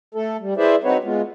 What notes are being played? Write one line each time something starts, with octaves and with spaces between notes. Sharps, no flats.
A3 A4
G3
E4 G#4 B4 C5 D5 E5
C4 D#4 F#4 B4 C#5
G#3 B3 F4